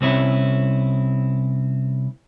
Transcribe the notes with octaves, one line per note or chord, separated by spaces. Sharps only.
C2 C4 C#4 E4